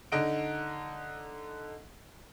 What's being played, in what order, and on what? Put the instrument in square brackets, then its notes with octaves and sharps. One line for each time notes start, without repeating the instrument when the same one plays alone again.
[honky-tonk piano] D3 D#4 D7